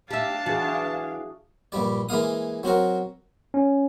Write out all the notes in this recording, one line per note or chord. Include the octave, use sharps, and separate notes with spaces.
D4 G4 E5 F5 A5
E3 F#4 G#4
A#1 G2 G3 D5
E3 G#3 A#3 F5 D#6
F#3 C4 F#4 A#4
C#4